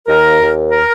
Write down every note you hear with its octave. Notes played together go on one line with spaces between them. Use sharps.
D#2 A#4
D#2
A#4